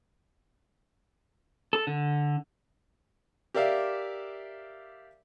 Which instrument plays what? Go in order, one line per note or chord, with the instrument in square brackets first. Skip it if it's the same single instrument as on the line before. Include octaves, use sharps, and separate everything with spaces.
[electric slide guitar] A4
D3
[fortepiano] G4 A#4 D5 E5 F5